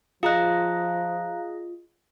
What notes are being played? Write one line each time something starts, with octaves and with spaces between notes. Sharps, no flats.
F3 F4 G#4 D#5 F5 A#5 F#6